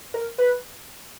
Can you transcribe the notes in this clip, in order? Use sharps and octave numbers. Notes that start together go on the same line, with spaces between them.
A#4
B4